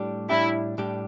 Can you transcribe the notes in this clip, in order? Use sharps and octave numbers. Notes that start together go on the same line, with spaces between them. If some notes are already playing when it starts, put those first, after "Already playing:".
Already playing: A2 G3 D4 G4
A2 G3 D4 E4 G4
A2 G3 D4 G4